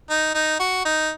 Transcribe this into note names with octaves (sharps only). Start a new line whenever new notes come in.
D#4
D#4
F#4
D#4